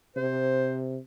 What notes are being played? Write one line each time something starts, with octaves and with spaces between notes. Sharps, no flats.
C3 C5